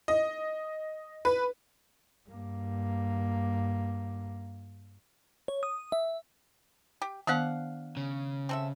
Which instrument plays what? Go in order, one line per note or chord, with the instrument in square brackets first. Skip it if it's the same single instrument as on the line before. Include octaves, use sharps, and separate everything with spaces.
[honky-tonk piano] D#5
B4
[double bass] G2 A#3
[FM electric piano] C#5
D#6
E5
[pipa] G4
[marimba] D#3 B3 [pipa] D4 F5 F#5
[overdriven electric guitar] C#3
[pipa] C4 A4 E5